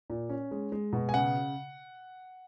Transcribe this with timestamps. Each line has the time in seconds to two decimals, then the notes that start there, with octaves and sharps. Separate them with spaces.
0.10 A#2
0.29 C#4
0.51 G#3
0.72 G#3
0.93 B2
1.09 G#5
1.14 C#3 F#5